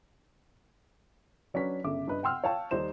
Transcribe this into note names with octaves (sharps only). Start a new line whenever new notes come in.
F#3 C#4 D4 B4 B6
G1 C#3 E5 D6
G2 B4 D#5
F#5 G5 C6 E6 F6
C#5 F5 G5 A5
D#2 G3 D#4 C5 E7